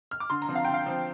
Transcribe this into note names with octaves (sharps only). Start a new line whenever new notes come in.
F6
D6
D3 C6
A#5
F3 C4
F5
D3 G5
F5
F3 C4